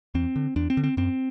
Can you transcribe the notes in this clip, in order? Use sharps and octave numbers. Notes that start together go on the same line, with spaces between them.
E2 C4
D3
E2 D4
C4
D3
C4
F#2 C4